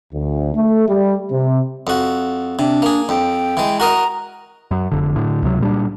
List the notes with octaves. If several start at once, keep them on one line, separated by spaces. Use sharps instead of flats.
D2
A3
G3
C3
F2 F#4
C3 D4
A#3 G#4
F2 G5
E3 G#3
F#4 A#4 D#5 A#5
F#2
F1 D3
A2 D3
C#2 C3 F#3
A#2 G3 D4